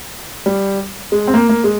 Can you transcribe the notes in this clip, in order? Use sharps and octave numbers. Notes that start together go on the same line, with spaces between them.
G3
G#3
C4
A#3
A#3
G#3